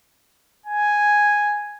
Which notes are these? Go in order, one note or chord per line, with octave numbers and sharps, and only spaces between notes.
G#5